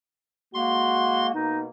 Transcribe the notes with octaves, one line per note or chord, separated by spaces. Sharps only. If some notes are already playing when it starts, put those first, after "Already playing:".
G#3 A#3 F#4 C6
B2 A#3 D#4